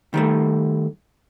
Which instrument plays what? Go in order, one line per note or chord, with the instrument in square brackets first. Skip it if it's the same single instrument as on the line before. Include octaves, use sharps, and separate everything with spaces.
[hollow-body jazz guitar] D#3 G3 A3